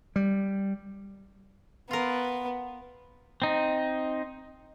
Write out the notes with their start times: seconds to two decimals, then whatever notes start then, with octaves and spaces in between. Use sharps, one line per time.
0.16 G3
1.91 B3 F4 A#4
3.42 C4 D#4